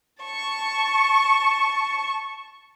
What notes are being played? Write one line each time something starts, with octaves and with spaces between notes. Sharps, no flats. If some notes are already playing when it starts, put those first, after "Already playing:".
A5 C#6